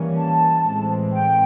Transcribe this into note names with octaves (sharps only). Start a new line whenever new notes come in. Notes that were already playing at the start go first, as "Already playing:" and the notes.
Already playing: E3 G3 A#3 C#4
A5
A2 E3 G#3 C4
G5